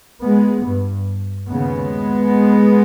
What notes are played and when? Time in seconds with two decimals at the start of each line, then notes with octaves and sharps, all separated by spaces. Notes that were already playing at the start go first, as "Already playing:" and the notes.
0.23 G#3 B3
0.64 G2
1.49 D#2 C#3 G#3 B3